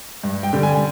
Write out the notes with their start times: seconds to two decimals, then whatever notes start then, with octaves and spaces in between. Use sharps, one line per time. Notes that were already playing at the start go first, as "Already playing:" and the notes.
0.24 G2
0.43 G5
0.53 D3 G3
0.63 G#5